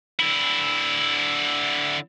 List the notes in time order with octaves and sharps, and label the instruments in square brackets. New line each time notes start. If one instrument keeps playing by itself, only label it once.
[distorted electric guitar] D3 E4